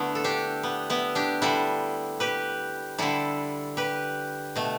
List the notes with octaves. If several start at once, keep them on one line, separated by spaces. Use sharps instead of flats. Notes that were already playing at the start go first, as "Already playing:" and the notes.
Already playing: D3 A3 B3 E4
A4
D4 G4
B3
B3 E4
D4 G4
D3 G3 E4 A4
G4 B4
D3 G3 E4 A4
G4 B4
B2 A3